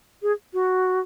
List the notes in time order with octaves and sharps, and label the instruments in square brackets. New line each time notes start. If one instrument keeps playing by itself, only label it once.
[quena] G#4
F#4